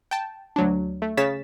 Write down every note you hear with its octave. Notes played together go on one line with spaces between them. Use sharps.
G5 A5
D2 F#3 D4
A3
C#3 C#5 A6 B6 E7